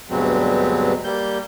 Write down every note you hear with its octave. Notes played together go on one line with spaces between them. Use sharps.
D2 G2 B2 F#3 G#3 C4
G3 A#3 G6